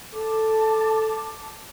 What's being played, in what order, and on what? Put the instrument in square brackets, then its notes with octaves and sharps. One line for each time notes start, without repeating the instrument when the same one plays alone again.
[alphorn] A4 [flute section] A5 D6